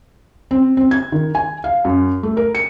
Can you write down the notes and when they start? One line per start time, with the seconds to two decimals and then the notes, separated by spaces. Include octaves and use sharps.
0.51 C4
0.77 C4
0.91 G#6
1.12 D#3
1.35 G#5
1.64 F5
1.85 F#2
2.23 A3
2.37 A#4
2.55 C#7